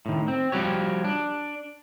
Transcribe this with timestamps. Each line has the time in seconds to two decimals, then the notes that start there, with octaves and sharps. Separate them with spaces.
0.06 A2 D#3
0.28 C4
0.52 F3 G3 F#4 G4 C#5
1.04 D4